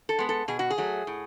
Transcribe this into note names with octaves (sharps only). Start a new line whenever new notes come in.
A4
G#3 B3
A4
B2 G#4
F#4
G#4
F#3 A3
A2